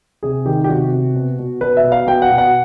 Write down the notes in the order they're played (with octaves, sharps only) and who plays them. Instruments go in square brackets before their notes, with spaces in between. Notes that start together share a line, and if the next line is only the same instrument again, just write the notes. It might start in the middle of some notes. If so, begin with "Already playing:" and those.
[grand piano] C3 G#4
D#3 G4
G4
C3 F#4
C3
B2
B2
B2 B4
E5
B2
F5
B2 G5
F#5
B2
F#5